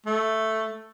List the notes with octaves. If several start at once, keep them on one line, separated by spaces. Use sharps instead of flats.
A3